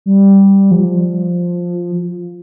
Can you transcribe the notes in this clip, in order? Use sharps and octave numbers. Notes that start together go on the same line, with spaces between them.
G3
F3